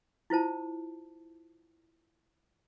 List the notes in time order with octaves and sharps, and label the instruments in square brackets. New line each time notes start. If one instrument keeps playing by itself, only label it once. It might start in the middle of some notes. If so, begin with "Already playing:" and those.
[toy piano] E4 F4 C5 A5